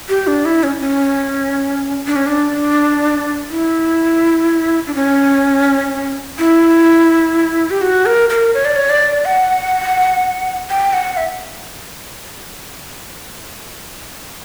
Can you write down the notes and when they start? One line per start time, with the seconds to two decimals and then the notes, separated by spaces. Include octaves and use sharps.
0.09 G4
0.27 D4
0.45 E4
0.63 C#4
0.81 C#4
2.07 D4
2.16 C#4
2.26 D4
3.50 E4
4.87 D4
4.95 C#4
6.39 E4
7.71 G4
7.81 F#4
8.06 A#4
8.29 A#4
8.54 C#5
8.65 D5
8.76 C#5
8.90 D5
9.25 F#5
10.70 G5
10.93 F#5
11.17 E5